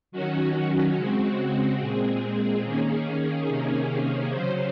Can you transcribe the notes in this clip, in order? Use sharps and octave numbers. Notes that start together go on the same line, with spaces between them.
D#3 F#3 C#4 F#4
C#3 G#3 C4
A#2 G#3 C4 G#4
D#3 A#3 C#4 G#4
C3 D#3 A#3 C#4
C#3 F#3 C#4 C5